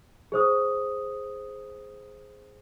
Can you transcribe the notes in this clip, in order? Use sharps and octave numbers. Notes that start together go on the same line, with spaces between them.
G#4 C5 D#6